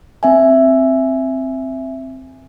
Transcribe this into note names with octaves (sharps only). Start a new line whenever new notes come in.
C4 E5 G#5